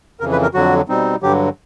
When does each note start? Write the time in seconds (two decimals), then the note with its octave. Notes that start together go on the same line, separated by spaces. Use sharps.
0.20 F2 C#3 E3 A#4
0.32 B4
0.42 A#4
0.54 F2 D3 F#3 F#4
0.88 B2 G3 C4 D#4
1.22 G2 D3 F#3 G4